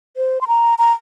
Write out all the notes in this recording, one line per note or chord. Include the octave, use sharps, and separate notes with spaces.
C5
C6
A#5
A#5